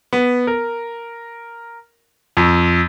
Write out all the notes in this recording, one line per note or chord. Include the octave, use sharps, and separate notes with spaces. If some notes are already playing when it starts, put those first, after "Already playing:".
B3
A#4
F2